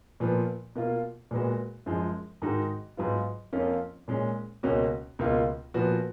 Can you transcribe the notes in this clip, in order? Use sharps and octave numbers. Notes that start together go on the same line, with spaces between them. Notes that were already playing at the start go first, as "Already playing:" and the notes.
A#2 F3 B3
B2 A#3 F4
A#2 G#3 B3 F#4
F#2 F3 G#3
G#2 D#3 G#3 D#4 F#4
G#2 F#3 B3 F4
F2 F3 A#3 C#4 F4
A#2 G#3 C#4
C#2 B2 A#3 C#4 F#4
C#2 B2 A#3 F4
A#2 F3 B3 F#4